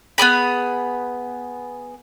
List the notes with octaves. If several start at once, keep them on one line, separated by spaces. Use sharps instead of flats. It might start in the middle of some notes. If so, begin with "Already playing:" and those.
B3 C4 G#4 B5